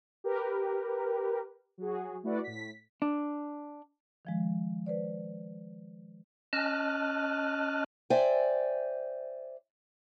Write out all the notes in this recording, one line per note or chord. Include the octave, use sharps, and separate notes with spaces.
G4 A#4 B4
F#3 F#4 G#4
A3 E4 F#4 B4 D5 F#5
A2 B6
D4
D#3 F3 G#3
B4 C5 D5
C#4 D#5 A5 F6 F#6
C5 D5 E5 G5 G#5